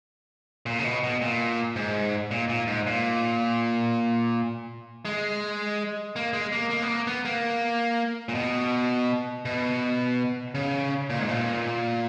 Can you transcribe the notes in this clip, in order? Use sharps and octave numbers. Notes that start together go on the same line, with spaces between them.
A#2
C#3
B2
B2
A#2
G#2
A#2
A#2
G#2
A#2
G#3
A#3
G#3
A#3
A#3
B3
A#3
B3
A#3
A#2
B2
B2
C#3
A#2
G#2
A#2